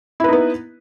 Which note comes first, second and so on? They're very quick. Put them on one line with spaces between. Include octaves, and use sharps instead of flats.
E4 B4 D#4 B3